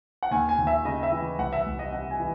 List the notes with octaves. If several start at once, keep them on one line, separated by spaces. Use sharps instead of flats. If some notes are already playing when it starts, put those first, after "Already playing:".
F#5
D#2 G#5
G#5
D#2
E5
C#3 D#5
E5
E3
C2 F#5
E5
C2
D#5
C3 F#5
G#5
E3